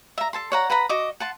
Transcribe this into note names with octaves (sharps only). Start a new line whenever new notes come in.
E5 A#5
A4 A5 C6
C#5 F#5 A#5
B4 F#5 A#5 B5
F#4 D#5 D6
F#5 A5 C6